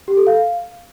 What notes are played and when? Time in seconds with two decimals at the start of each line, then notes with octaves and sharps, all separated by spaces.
0.08 G4
0.17 A4
0.27 F5